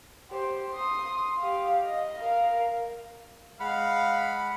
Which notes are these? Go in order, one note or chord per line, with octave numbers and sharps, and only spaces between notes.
G4 C5
C6 D#6
G4 F5
D#5
A#4 F5
G#3 F5 F#5 B5